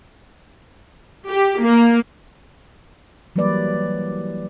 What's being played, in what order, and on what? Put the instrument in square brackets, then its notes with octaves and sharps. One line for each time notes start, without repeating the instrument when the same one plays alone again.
[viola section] G4
A#3
[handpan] E3 F#3 G3 A#3 B4 D5